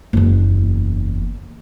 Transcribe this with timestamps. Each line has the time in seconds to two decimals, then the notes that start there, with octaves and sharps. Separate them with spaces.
0.13 F#1 E2